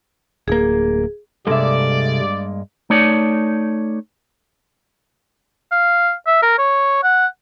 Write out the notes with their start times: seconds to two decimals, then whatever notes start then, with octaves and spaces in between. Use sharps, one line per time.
0.48 D1 A#3 G#4
1.47 G2 C3 G#3 A#3 A4 D5 E5
2.90 A3 D#4 C#5 D5
5.72 F5
6.27 E5
6.42 A#4
6.58 C#5
7.03 F#5